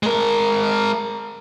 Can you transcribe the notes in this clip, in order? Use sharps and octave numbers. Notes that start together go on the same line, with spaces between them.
G#3 A#4